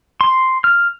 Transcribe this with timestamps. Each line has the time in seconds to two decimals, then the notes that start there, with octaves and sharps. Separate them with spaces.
0.21 C6
0.64 F6